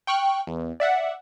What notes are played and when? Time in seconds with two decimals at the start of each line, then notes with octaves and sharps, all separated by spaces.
0.07 G5 C#6 F6 F#6
0.47 E2
0.80 D5 E5 F#5